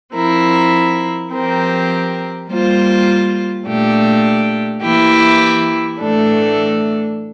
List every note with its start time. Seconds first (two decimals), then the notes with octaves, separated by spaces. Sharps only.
0.14 F3 C4 E4 A#4
1.31 F3 C4 G4 A#4
2.48 G3 A#3 F4 C5
3.65 A#2 A3 D4 G4
4.82 E3 A#3 E4 G4
5.99 A2 E3 A3 D4 A4